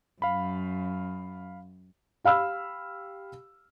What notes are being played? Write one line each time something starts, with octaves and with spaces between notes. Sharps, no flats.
F#2 F5 B5
G4 F5 B5 E6 F6